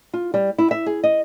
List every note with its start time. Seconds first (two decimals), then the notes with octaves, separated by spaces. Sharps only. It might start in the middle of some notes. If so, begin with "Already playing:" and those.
0.13 F4
0.34 G3
0.58 E4
0.71 E5
0.86 G#4
1.04 D#5